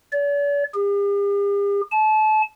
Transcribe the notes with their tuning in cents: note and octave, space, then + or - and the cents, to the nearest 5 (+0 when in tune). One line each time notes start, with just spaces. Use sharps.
D5 -45
G4 +45
A5 -30